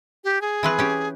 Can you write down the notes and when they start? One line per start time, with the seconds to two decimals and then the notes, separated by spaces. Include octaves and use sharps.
0.24 G4
0.41 G#4
0.63 E3 C4 B4
0.79 C#4 G4